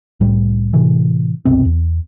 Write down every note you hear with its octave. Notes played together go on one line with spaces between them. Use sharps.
C2 A2 G3
A2 C3 E3
F#1 C2 B2 C4
E2